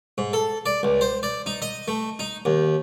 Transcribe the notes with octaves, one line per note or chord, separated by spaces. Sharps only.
G#2
A4
D5
C#2
C5
D5
D#4
D#5
A3
D#4
D#2